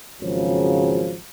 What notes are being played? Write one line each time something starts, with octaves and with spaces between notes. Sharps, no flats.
G#1 C#3 F3 F#3